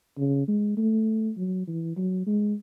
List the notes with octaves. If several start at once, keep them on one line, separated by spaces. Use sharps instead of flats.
C#3
G#3
A3
F#3
E3
F#3
G#3